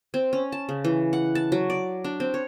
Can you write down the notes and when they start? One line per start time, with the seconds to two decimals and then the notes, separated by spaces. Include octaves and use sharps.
0.14 C4
0.33 C#4
0.52 A5
0.69 C#3
0.85 E3
1.13 F#5
1.35 A5
1.52 F#3
1.70 D5
2.04 D4
2.20 C4
2.34 C#5